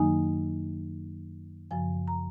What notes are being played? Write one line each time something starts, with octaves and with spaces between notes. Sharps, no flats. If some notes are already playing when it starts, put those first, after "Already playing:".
Already playing: F#2 D#3 F#3 A#3 D#4 G#5
F#2 C#3 F3 G#5
A#5